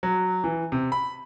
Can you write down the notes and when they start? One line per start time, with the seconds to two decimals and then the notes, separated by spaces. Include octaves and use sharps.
0.03 F#3
0.44 E3
0.72 C3
0.92 B5